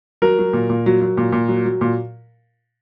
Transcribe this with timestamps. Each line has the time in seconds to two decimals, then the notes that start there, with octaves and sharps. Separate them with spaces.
0.22 F#3 A#4
0.39 F#3
0.53 A#2
0.70 A#2
0.86 F#3
1.01 F#3
1.17 A#2
1.32 A#2
1.48 F#3
1.65 F#3
1.81 A#2